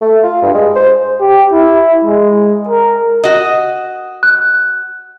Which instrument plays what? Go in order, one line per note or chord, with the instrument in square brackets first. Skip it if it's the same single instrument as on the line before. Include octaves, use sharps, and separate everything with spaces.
[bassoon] A3
F4
G2
G#3
C5
[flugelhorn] G4
E4
G#3
A#4
[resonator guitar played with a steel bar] F#4 D#5
[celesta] F#6